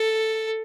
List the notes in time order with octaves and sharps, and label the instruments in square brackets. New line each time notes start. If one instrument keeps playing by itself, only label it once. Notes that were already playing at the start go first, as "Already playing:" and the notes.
Already playing: [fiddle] A4